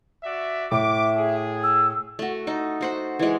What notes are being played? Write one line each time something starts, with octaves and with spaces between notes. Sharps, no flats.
F#4 D5 E5
A2 E5 D6
G#4
E6
A3 F#4
D#4 A4
F#4 C5 F#5
E3 G#3